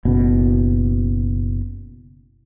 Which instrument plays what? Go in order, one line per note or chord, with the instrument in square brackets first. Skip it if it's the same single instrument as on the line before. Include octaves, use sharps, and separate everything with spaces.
[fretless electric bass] F#1 B2